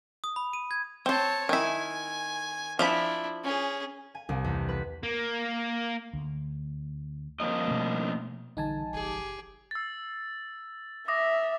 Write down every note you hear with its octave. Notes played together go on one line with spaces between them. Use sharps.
D#6
B5
D#7
G#6
C4 C5 C#5 A5
D#3 E4 G#5
F3 D4 E4 E5 B5
C#4 G#4
G#5
C2
E2
B4
A#3
D2
F3 A#3 D#5
B2 A3
A#1 D3 E3 G3 D#4 G#5 A5
F#1 G4 G#4
E6 A6
E5 D6 D#6 A#6